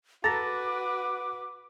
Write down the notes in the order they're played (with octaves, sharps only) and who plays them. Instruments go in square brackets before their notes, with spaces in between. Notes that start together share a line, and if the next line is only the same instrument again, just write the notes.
[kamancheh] F#4 B4 [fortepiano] A4 A5 A#5 [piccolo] D6 [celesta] A6 A#6